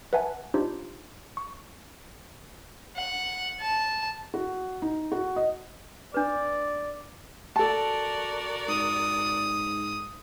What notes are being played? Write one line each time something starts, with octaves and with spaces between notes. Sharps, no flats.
B4 E5 F#5 G#5 A5
D4 D#4 F4 G4 C5
C#6
F#5
A5
F#4
D#4
F#4
D#5
D4 B4 D5
F#4 A4 A#4 D5 A5
G#2 D#6